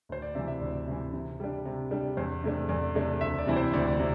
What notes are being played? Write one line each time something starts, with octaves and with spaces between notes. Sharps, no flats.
D2 C5
D5
C3 E3 E5
E5
D2 D5
C3 E3
C3
G3 D4
C3
G3 D4
E2 C5
C3 A3 D4
E2 D5
C3 A3 D4
D2 E5
D5
C3 E3 C4 E4
C5
D2 D5
D5
C3